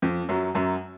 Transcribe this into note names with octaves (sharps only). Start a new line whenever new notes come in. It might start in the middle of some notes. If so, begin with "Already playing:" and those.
F2 F3
F#2 F#3
F#2 F#3